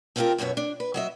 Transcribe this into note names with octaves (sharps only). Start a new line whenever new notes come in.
A3 B3 C4 F4 G4 A#4
F#2 B2 B3 C#5 E5
D4
B4
F#3 D#5 E5